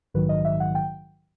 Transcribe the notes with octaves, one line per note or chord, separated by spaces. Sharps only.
A#1 G#2 D#3 F#3 B4
D#5
E5
F#5
G5